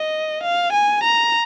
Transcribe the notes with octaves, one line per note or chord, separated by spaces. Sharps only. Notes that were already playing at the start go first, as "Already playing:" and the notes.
Already playing: D#5
F5
G#5
A#5